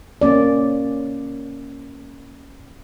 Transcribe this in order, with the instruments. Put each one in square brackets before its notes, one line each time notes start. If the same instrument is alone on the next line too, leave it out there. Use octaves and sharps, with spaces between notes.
[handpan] A#3 C#4 D5